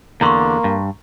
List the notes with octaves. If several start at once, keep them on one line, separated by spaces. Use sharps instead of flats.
E2 D3 A#3 A#5 C6 C#6
G2